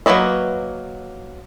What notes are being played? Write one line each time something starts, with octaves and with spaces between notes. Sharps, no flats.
F#3 A#3 B4 D#5 E5